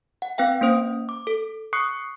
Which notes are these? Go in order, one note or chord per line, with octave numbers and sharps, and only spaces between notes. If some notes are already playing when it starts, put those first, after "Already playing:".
F#5
C4 B4 F5 G5
A#3 C#4 C5 D#6
D6
A4
C#6 D#6 F#6 C7 C#7